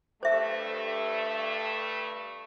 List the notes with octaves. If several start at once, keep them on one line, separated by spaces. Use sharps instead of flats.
G2 A3 C5 E5